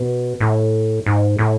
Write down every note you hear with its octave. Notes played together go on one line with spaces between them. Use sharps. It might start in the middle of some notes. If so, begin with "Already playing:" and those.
Already playing: B2
A2
G#2
A2